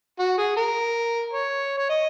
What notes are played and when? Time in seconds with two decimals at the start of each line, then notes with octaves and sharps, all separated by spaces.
0.19 F#4
0.38 G#4
0.57 A#4
1.33 C#5
1.77 C#5
1.89 D#5